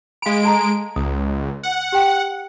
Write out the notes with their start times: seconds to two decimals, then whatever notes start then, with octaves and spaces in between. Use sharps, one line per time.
0.22 G#3 F5 B5 D7
0.43 A4 A5 A#5
0.96 C#2 D#6
1.63 F#5
1.92 G4 G5